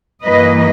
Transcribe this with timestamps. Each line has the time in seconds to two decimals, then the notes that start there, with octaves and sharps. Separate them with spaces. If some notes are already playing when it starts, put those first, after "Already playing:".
0.24 G2 E3 A#3 B4 D#5